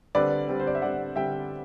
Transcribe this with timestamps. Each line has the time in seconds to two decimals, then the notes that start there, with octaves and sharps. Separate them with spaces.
0.15 D3 G3 C4 B4 D5
0.48 D3 G3 C4
0.60 C5
0.67 D5
0.75 E5
0.82 D3 G3 C4 D5 F#5
1.16 D3 G3 C4 E5 G5